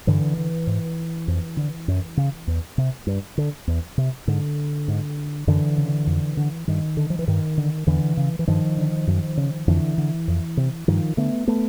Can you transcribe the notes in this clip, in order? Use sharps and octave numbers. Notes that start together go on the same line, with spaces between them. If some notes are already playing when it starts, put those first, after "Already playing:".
G2 D3 E3
D3
G#2
F2
D3
F#2
C#3
E2
C3
G2
D3
E2
C3
G#2 D3
G#2
F#2 D3 E3
C#3
F2
D3
G2 D#3
D3
F3
E3
G2 D#3
D3
E2 D3 E3
C#3
E3
G2 D#3 F3
D3
F#2
C#3
F2 D3 E3
D3
F2
C3
G2 D#3 F3
D3 A3 B3
A3 B3